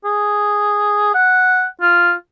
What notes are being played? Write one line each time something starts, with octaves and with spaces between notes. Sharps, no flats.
G#4
F#5
F4